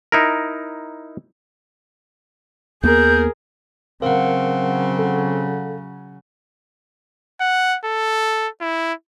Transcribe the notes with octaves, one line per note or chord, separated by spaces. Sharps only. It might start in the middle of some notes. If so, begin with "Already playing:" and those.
D#4 E4 A#4
D#2 A#3 B3 G#4 A#4 G6
C#3 F#3 C4 A#4 F5 F#5
A4
F#5
A4
E4